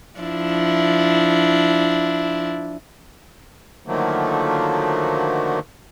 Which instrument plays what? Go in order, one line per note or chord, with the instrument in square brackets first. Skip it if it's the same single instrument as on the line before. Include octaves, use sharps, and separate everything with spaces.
[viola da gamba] F3 D4 E4
[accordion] D3 D#3 F3 F#3 A3 A#3